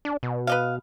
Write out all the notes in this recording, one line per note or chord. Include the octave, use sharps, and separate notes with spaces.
D4
B2
B4 D#5 F5